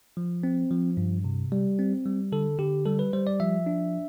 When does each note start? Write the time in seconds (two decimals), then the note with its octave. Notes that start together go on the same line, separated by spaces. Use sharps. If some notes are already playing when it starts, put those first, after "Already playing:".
0.17 F3
0.43 C4
0.71 F3
0.97 G2
1.24 C3
1.52 G3
1.79 C4
2.05 G3
2.32 D3 A4
2.59 D3 G4
2.86 G3 A4
2.99 B4
3.13 G3 C5
3.27 D5
3.40 F3 E5
3.66 D4